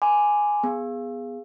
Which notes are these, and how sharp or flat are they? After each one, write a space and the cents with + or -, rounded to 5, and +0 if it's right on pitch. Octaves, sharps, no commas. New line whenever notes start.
G#5 +0 B5 +45 D6 +0
B3 +0 G#4 -5